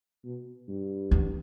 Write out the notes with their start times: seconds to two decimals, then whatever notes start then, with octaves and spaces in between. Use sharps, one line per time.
0.24 B2
0.68 G2
1.11 E2